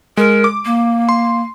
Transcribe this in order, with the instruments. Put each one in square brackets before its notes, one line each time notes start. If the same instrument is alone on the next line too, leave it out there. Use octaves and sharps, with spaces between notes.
[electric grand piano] G#3 [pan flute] A#4
[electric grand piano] D6
[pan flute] A#3
[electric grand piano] C6